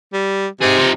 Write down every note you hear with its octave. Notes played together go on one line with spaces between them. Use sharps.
G3
C3 D#4 G#4
F3 D#4